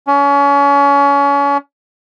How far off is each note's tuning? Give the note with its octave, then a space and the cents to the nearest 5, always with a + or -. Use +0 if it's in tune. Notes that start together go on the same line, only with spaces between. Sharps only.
C#4 +30